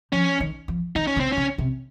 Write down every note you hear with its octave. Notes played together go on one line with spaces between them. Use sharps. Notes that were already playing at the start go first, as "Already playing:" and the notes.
F3 C#4
D#3
F3
D#3 D#4
C#4
C#3
C4
C#3 C#4
C3